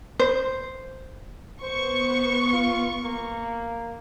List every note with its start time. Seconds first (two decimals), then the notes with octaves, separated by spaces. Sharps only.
0.19 C5
1.62 B3 C5 C#6
2.53 F4
3.04 A#3